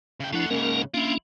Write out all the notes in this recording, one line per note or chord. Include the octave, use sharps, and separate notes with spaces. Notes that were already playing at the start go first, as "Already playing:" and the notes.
C#3 G5
F3 A3 D4 E4 F#5
G#2 C#3 A#3 C#4 A#4
A#3 C#4 D4 E4 F4